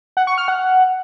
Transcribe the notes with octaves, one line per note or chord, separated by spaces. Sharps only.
F#5
C#6
F6
F#5